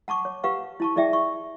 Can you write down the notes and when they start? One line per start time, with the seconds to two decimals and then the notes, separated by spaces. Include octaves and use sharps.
0.08 F#5 A5 C#6 D6
0.25 C#5
0.44 G4 B4 F5 F#5 C#6
0.80 E4 A5 C#6
0.96 E4 G#4 D5 E5 G5
1.13 C#6